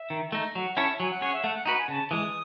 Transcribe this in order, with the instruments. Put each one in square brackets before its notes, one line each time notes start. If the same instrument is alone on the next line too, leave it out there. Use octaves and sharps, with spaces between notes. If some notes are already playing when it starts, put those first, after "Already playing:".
Already playing: [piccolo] E5
[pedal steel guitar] D#3
A3 D#4
[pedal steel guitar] F#3 [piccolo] F#5
[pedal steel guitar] C#4 E4 A4 C#5 [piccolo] E5
[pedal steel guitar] F#3 [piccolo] G#5
[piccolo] F#5
[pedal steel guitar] C#4 G#4 C#5 [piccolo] F#5
[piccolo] E5
[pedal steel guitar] A3 [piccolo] F#5
[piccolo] F#5
[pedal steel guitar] D#4 F#4 B4 [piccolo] F#5
[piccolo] G#5
[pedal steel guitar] C#3 [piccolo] A5
[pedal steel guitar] E3 G#3 [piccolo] D#6